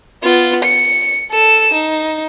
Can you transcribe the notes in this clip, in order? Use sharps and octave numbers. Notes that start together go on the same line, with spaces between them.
B3 F4
C#7
A4 E7
D#4